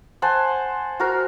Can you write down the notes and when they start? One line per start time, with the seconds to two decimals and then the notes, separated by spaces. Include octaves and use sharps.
0.22 C5 F#5 G#5 A5
1.00 F#4 A#4 C5